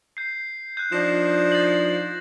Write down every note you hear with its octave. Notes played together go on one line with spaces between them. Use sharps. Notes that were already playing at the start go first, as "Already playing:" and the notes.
G6 C7
F#6 G6
F3 D4 D#4 A#6 E7
A6 F#7